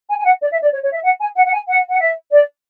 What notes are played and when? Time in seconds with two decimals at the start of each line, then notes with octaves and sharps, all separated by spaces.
0.08 G#5
0.19 G#5
0.24 F#5
0.40 D5
0.51 E5
0.62 D5
0.72 C#5
0.82 C#5
0.93 E5
1.04 F#5
1.20 G#5
1.36 F#5
1.46 F#5
1.52 G#5
1.67 F#5
1.91 F#5
1.99 E5
2.31 D5